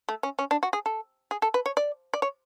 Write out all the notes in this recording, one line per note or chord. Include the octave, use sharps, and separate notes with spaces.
A3
C#4
C#4
D4
F#4
G#4
A4
G#4
A4
B4
C#5
D5
D5
C#5